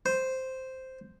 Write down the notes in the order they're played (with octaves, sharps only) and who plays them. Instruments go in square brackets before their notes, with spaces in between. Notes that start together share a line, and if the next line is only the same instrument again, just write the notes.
[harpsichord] C5